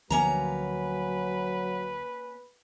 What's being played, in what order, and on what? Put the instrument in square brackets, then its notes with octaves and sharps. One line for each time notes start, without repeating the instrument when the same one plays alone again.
[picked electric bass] D2 F3 [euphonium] F#3 [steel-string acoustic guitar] A#3 C#4 A#5 [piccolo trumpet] B4